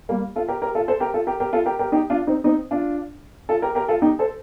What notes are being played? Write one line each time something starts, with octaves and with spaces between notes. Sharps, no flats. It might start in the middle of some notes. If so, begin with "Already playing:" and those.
G3 A#3
F4 A4
G4 A#4
G4 A#4
F4 A4
A4 C5
G4 A#4
F4 A4
G4 A#4
G4 A#4
F4 A4
G4 A#4
G4 A#4
D#4 G4
D4 F4
C4 D#4
C4 D#4
D4 F4
F4 A4
G4 A#4
G4 A#4
F4 A4
D#4 G4
A4 C5